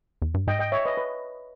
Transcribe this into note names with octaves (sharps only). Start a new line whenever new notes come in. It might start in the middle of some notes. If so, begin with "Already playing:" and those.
E2
G2
G#2 D#5 G5
D#5 G5
C#5 E5
B4 D#5
B4